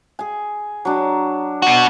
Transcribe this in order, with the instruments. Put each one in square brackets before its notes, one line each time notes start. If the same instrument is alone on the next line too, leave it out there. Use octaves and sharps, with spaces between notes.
[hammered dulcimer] G#4 G#5
F#3 D4
[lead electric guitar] B2 F#4